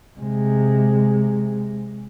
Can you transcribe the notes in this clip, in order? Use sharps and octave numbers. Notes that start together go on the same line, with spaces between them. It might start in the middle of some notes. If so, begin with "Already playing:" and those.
C3 G#3